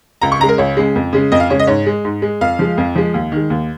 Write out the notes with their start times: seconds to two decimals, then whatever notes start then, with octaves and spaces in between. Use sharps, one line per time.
0.22 C#2 A#5
0.32 C#6
0.40 C#3 A#5
0.43 G#3
0.49 A#4
0.58 C#2 C#5
0.77 C#3 G#3
0.96 F2
1.13 C#3 G#3
1.32 F2 D#5
1.40 F5
1.50 C#3 G#3 C#5
1.59 D#5
1.67 G#2 C#5
1.86 G#3
2.05 G#2
2.22 G#3
2.41 F2 F5
2.59 F3 G#3
2.78 F2
2.95 F3 G#3
3.14 D#2
3.32 D#3 G#3
3.50 D#2